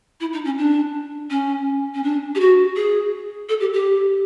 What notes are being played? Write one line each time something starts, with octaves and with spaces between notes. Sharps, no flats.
E4
D#4
C#4
D4
C#4
C#4
D4
G4
F#4
G#4
A4
G4
G4